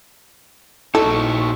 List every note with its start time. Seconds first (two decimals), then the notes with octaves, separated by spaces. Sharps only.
0.95 A#1 D#4 E4 F#4 A4 D#5 C#6